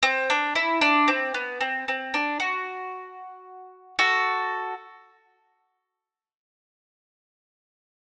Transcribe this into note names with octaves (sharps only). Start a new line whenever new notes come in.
C4
D4
E4
D4
C4
B3
C4
C4
D4
F#4
F#4 A4